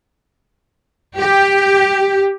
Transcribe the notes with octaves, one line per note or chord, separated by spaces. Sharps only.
G4